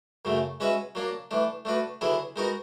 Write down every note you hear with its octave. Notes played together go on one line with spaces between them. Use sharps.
F#2 C#3 F#3 A3
G#3 C#4 F#4 B4 E5
F#3 A#3 D4
E3 A3 D4
A3 D4 F#4 B4
D3 F#3 B3 E4 G#4
G#3 B3 D#4 F#4 A#4